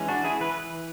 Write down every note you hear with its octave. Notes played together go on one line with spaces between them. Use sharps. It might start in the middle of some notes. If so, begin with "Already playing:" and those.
Already playing: E3 G#3 C#4
D4 F#4
E4 G#4
E3 B4